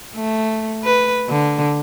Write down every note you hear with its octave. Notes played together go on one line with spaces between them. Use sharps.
A3
B4
D3